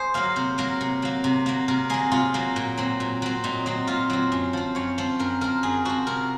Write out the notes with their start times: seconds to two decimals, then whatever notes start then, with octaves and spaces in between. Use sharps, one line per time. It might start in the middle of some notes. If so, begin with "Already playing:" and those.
Already playing: G#4 C5
0.14 F#3 A#3 F5
0.36 C3 C5
0.58 F#3 A#3 A#4
0.81 C3
1.02 F#3 A#3
1.24 C3
1.46 F#3 A#3
1.68 C3 A#4
1.90 F#3 A#3 G#4
2.12 C3 F4
2.34 F#3 A#3
2.56 A#2
2.77 F#3 C4
3.00 A#2
3.22 F#3 C4
3.44 A#2 D#4
3.66 F#3 C4
3.87 A#2 F4
4.10 F#3 C4
4.32 F#2
4.53 F3 C4
4.75 F#2 C#5
4.98 F3 C4 C5
5.19 F#2 A#4
5.41 F3 C4 A#4
5.63 F#2 G#4
5.85 F3 C4 F#4
6.07 C3 A#4